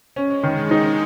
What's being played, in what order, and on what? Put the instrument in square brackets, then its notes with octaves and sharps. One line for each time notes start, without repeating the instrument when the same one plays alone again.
[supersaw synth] G#3 [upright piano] C#4
[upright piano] D#3
[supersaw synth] A#3 [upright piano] D#4